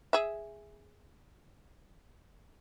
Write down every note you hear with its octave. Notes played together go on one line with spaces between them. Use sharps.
G#4 E5